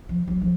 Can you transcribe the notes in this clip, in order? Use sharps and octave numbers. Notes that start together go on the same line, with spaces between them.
F3
F#3
F3